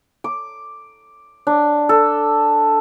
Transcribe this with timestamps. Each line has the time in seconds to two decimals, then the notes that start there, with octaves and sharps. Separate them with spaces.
0.24 D6
1.47 D4
1.89 A4